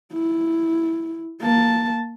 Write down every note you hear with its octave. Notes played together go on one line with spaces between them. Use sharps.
E4
A#3 A5